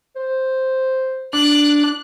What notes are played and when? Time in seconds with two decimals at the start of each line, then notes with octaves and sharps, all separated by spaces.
0.16 C5
1.33 D4 F#6